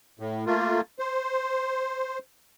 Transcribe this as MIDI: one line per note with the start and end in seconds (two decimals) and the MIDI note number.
0.19 0.45 45
0.46 0.81 57
0.46 0.81 58
0.46 0.81 65
0.99 2.18 72